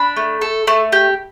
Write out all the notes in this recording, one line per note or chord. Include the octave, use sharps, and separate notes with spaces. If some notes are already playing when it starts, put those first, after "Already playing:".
Already playing: D4 B5
A3
A4
A3
G4